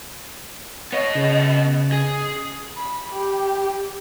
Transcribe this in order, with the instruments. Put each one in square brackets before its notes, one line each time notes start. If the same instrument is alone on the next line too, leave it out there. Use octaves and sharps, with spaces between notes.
[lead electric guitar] B3 D#5 [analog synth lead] C#5
[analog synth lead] C#3
[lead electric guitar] G#4
[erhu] B5
G4